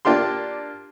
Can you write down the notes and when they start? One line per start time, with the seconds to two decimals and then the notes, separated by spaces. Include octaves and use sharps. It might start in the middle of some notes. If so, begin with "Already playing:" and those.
0.05 A#3 D4 F4 G4 C6